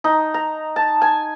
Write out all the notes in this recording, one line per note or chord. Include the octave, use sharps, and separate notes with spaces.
D#4
A#5
A5
G#5